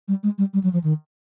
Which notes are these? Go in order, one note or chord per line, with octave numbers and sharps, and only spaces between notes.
G3
G#3
G3
G3
F#3
F3
D#3